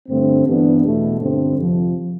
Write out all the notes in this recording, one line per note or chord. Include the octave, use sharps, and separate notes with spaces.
G2 D3 A3 C4
G2 E3 G3 B3 D4
E2 B2 A3
G2 D3 G3 C4
F2 C3 F3